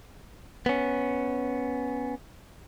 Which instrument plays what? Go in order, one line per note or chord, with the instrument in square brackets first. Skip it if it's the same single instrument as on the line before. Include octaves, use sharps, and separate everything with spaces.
[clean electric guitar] B3 C#4